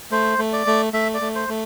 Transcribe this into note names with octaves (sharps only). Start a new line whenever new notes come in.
A3 C5
A3
D5
A3
A3 E5
D5
A3
C5
A3